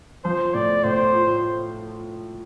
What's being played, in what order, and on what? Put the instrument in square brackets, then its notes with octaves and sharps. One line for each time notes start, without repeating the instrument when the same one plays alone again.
[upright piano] F3 [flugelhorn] C5
[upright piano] A2 [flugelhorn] D5
[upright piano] A2 [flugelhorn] C5
[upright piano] F4